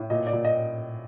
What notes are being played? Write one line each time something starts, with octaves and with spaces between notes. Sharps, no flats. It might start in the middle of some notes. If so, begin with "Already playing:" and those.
Already playing: A2
A#2 D#5
D5
A#2
D#5